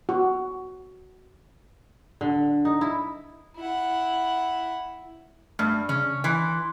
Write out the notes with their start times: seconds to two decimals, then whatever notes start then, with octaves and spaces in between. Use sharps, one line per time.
0.09 F#4
2.21 D3
2.65 D#4
2.81 E4
3.56 E4 F#5
5.59 G2 A3
5.89 C#3 C#4
6.24 E3 C6